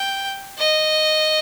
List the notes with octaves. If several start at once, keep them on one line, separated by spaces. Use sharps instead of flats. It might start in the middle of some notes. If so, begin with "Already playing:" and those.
Already playing: G5
D#5